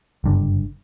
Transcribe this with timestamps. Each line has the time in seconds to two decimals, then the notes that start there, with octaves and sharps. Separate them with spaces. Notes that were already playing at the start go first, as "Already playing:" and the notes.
0.24 F#1 G2 D3